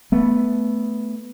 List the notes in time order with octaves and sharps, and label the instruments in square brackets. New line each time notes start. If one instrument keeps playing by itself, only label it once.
[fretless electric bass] A3 B3